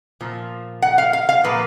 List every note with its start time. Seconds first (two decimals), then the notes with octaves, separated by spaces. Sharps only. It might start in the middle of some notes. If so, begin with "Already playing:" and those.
0.21 A#2 F3
0.82 F#5
0.98 F5
1.13 F5
1.29 F5
1.44 A#2 F3 A#3 B4